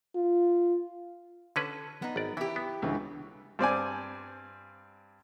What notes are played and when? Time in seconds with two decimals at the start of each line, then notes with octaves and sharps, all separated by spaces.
0.15 F4
1.56 D3 C#4 A4 B4
2.02 B3 D#4
2.16 G#1 D5
2.37 E3 E4 G4
2.56 B3
2.82 C#2 D3 E3
3.59 G2 C4 D5 G#5